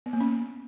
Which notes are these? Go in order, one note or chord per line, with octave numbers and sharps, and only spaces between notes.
B3
A#3
C#4